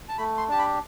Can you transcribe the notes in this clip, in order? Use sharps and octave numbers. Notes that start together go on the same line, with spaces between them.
A5
A3 B5
C6
D4 G4 A5
B5